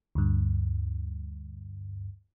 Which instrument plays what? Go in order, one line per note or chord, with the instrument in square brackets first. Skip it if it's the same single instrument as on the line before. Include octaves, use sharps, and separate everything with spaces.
[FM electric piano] D2 G2